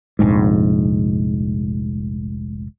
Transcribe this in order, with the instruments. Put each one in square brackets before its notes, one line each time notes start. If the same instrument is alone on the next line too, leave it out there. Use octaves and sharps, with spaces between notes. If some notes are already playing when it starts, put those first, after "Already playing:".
[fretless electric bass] F1 A#1 G#2